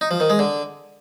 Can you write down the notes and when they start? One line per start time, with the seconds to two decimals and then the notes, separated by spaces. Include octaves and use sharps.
0.01 D#4
0.11 F3
0.20 D#3
0.30 G#3
0.39 D3